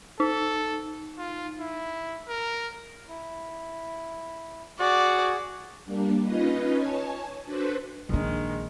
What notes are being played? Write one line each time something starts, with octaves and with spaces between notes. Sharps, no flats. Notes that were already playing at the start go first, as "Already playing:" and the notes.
D#4 A4
F4
E4
A#4
E4
F#4 G#4 D5 F#5
G3 A#3 D4
C#4 D#4 F4 B4 D#5
C#5 G#5 A5
D4 F#4 A4 B4 C5
A#1 D#3 G#3 D4